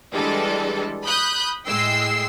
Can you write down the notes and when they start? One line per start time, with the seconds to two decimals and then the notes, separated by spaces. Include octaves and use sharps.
0.14 E3 G3 G#3 D4 A4
1.05 B5 D#6 F#6 G6
1.66 A2 G#3 G5 E6 C7